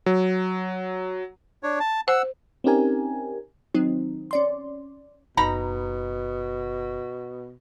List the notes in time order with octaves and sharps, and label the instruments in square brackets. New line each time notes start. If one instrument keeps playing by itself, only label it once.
[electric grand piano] F#3
[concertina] D4 C#5
A5
[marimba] C5 [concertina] F#5 E6
[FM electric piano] C4 C#4 D#4 G4 A#4 G#5
[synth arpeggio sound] D#3 F#3 C4 D#4
C#4 D5 C6
[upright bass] F#1 [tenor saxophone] B2 [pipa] D#4 A#5 B5